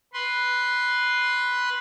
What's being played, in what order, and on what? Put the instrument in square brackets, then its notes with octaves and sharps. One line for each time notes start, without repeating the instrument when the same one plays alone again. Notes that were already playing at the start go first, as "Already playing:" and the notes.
[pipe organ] B4 C6